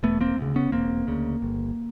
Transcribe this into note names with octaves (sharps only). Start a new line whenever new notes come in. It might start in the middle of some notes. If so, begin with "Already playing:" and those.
E1 A3 B3
A#3 C4
D2 C#3
B3 C#4
E1 A#3 C4
D2 C#3
G1